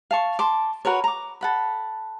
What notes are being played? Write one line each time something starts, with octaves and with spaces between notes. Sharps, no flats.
F5 A5 C#6
A5 C6 D6
F#4 A#4 B4 C#5
A#5 D6
A4 F#5 B5